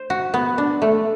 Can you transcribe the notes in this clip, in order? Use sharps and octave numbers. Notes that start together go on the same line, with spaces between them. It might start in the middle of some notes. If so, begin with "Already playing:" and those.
Already playing: C5
F#4
B3
D4
A3